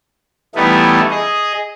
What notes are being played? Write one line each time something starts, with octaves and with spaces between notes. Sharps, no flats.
E3 G3 A3 B3 D#4 E4
G#4 D#5